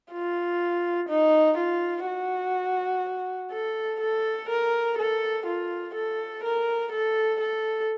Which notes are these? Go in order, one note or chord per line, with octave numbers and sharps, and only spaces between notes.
F4
D#4
F4
F#4
A4
A4
A#4
A4
F4
A4
A#4
A4
A4